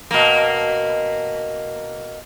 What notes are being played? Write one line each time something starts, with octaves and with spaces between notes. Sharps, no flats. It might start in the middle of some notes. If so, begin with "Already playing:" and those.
B2 A#3